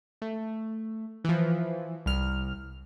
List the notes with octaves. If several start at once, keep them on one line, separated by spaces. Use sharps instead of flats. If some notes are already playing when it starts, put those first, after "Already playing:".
A3
E3 F3
C2 F6